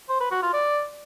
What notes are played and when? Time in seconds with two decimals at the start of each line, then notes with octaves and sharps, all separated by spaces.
0.09 C5
0.20 B4
0.31 F#4
0.43 F4
0.54 D5